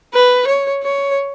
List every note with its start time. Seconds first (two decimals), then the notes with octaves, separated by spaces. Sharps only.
0.14 B4
0.47 C#5
0.83 C#5